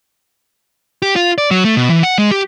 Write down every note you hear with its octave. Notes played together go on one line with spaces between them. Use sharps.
G4
F4
D5
F#3
A3
B2
E3
F#5
G#3
G4